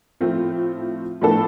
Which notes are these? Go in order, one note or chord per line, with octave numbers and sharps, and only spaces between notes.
A2 F3 A3 C4 F4
A2 F3 B3 D4 A4